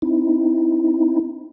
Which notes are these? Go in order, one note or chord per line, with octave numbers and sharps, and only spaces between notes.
C4 D#4 E4